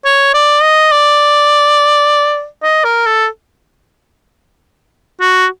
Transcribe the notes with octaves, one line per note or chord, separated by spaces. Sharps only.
C#5
D5
D#5
D5
D#5
A#4
A4
F#4